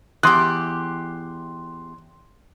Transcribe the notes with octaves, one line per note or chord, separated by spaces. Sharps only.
E2 G4 C6 F#6